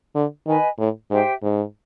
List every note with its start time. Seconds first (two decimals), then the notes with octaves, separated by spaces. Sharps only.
0.15 D3
0.46 D#3 B4 D#5 G#5 B5
0.79 A2
1.10 G#2 G4 C5 E5 G5
1.43 G#2